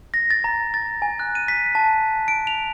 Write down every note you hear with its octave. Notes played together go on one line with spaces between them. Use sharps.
A#6
A6
A#5
A6
G#5
F#6
D#7
B6
A5
D7
F7